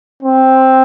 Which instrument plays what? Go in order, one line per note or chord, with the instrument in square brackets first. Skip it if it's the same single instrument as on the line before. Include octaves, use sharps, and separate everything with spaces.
[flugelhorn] C4